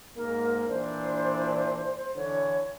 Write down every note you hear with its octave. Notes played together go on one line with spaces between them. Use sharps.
G#2 A#3 A#4
A#2 E3 D4 C5
D3 E3 C#5